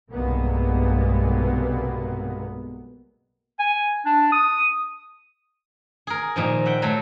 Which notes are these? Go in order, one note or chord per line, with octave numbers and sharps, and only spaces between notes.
B1 G2 C3 G#3 A#3 B3
G#5
D4
D#6
G#4 A#4
A#2 D#3 F3
E5 F#5 G5
F#3 A3 C5